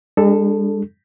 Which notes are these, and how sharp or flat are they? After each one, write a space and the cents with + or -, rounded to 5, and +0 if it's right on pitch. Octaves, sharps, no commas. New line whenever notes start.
G#3 -40 D4 +0 A4 +0